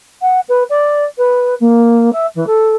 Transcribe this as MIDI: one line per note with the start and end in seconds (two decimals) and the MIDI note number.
0.22 0.40 78
0.49 0.63 71
0.70 1.05 74
1.18 1.55 71
1.60 2.10 58
2.13 2.26 76
2.35 2.44 52
2.47 2.75 69